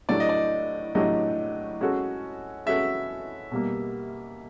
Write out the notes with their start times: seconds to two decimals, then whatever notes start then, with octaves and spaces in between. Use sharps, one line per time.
0.09 A2 F#3 A3 D4 G4 D5
0.20 D#5
0.29 D5
0.95 A2 F#3 A3 D4 G4 D#5
1.81 G#3 C#4 F#4 A4
2.66 G#3 C#4 F#4 A4 E5
3.52 B2 G3 A#3